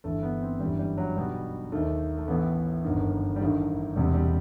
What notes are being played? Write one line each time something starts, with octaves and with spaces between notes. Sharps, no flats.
G1 G2 E3 A3
B3
C4
G1 F#2 E3 G3
G3
F#3
B1 B2 G3
D#2 D#3 A3
A3
A1 A2 E3 B3
G1 F#2 D#3
G3
A1 G2 D#3 A3
E1 E2 C3 G3
G3